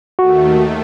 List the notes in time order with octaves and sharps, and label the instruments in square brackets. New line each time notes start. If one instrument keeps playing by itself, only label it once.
[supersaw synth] D#2 D#3 A3 [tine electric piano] F#4